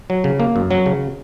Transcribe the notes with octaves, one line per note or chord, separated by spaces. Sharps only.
F#3
C#3
A#3
F#2
F#3
C#3